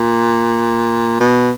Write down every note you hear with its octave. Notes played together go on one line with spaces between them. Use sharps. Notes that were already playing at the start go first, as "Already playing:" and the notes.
Already playing: A#2
B2